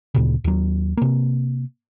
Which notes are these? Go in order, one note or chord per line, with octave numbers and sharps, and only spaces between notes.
D2 A#2 C#3
D#2 F#3
C3 A#3